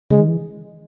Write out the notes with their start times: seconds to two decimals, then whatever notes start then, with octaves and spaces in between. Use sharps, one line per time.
0.11 C#3 G#3
0.19 D#3
0.28 E3